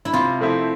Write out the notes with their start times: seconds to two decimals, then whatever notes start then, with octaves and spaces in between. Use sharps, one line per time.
0.05 E4
0.13 C3 F4
0.39 F3 A3 C4 E4